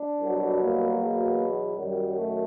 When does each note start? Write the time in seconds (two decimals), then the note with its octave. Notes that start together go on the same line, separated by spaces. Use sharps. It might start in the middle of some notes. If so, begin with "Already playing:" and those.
Already playing: D4
0.20 C2 B2 F#3
0.60 A#3
0.99 E2 B2 F#3
1.77 F#2 D#3 F#3 G3
2.16 A3